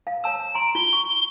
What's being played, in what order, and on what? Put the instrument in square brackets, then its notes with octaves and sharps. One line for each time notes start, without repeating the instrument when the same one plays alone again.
[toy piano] F5
[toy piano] C#5 A5 E6 [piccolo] E7
[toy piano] A#5 C6 [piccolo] D7
[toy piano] F4 [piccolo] G7
[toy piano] C#6